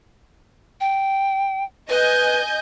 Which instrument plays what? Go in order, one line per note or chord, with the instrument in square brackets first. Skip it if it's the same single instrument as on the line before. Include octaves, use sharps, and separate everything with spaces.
[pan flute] G5
[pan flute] B4 [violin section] D#5 G#5 G6